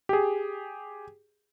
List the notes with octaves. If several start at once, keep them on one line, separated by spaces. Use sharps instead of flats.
G4 G#4